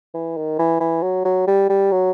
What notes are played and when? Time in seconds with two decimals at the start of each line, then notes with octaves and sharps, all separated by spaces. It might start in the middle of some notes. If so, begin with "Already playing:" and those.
0.14 E3
0.37 D#3
0.59 E3
0.81 E3
1.03 F#3
1.25 F#3
1.47 G3
1.70 G3
1.92 F#3